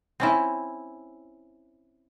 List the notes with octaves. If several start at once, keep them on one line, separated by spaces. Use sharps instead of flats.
C4 C#4 E4